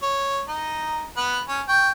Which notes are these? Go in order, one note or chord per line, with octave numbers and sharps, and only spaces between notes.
C#5
D#4
B3 F#5
C#4
G5 C#6